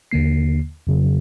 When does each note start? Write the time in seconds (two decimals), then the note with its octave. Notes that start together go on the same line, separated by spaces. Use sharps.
0.11 D#2 D3 A#3 C7
0.87 F2 C#3 F#3